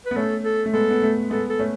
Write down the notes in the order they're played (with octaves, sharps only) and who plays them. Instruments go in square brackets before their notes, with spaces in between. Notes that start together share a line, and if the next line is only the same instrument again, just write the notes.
[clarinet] B4
[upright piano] B3
[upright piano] A3 C#4 [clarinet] A4
[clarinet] A4
[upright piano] A3
[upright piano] G#3 B3 [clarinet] A4
[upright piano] B3
A3
[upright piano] G#3 B3 [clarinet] A4
[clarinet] A4
[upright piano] A3 C#4